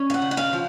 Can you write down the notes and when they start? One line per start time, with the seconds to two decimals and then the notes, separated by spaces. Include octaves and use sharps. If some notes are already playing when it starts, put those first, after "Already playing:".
Already playing: C#4
0.10 F5
0.14 F#5
0.22 C#3
0.31 F#5
0.37 F5
0.53 F3